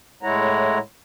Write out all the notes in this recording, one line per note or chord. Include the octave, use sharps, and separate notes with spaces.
A2 G#3 E4 C#5 F#5 A#5